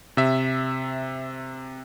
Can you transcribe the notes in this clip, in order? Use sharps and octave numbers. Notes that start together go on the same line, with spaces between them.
C3 E5